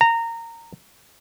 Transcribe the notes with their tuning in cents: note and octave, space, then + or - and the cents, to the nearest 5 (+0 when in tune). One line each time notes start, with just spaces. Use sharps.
A#5 -20